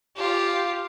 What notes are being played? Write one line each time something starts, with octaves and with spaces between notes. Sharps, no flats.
F4 G4